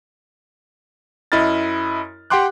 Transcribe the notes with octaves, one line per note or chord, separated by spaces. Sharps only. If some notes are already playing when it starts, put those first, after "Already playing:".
F#2 E4 D#5 B5 F6 A6
G4 F#5 G5 C6 D6 F#6